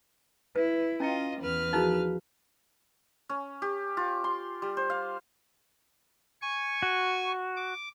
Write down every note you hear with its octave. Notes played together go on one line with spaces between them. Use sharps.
E4 B4
C#4 E4 F4 D#5 G5
E2 B4 F6
F3 D#4 E4 F#4 G#4 A#4
C#4
G4
F4
C6
G3
C5
F5
G#5 C#6
F#4
D6